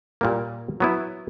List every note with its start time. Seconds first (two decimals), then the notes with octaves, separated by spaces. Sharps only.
0.21 A#2 G3 A#3
0.80 F#3 B3 E4